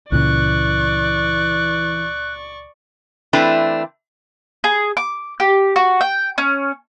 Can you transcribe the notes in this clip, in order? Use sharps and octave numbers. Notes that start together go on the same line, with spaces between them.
C#2 A#2 C#3 E3 D5 C#6 F#6
E3 A3 C4 D4 E4 B4
G#4
D6
G4
F#4
G5
C#4